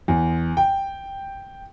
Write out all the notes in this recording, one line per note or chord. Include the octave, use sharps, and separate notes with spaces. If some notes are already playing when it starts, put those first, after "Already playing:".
E2
G5